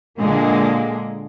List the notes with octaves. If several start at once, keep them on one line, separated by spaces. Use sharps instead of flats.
A#2 D3 G#3 A#3